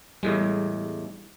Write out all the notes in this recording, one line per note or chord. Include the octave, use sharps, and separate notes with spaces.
E2 A2 G3 G#3